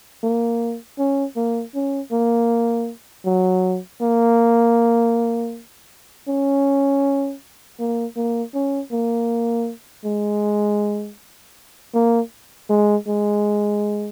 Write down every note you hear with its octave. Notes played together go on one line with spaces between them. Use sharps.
A#3
C#4
A#3
C#4
A#3
F#3
A#3
C#4
A#3
A#3
C#4
A#3
G#3
A#3
G#3
G#3